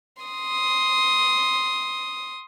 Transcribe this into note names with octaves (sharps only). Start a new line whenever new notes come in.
C6 D#6